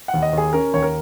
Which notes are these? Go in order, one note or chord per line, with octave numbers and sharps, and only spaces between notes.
F#5
D#2
D#5
D#2 G#4
C#4 A#4
D#2 C#5
A#4